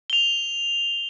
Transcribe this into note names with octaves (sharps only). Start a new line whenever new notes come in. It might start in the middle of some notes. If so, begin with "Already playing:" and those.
F7 G7